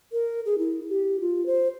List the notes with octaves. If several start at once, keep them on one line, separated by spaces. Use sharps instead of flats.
A#4
G#4
E4
G4
F4
C5